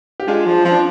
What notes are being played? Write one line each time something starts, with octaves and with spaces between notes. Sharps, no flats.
G4
G#3 D4 F4
F3
F3 C4
D4